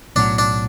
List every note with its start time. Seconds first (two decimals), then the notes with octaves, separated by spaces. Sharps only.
0.15 B1 A2 F#3 A3 D4
0.38 D4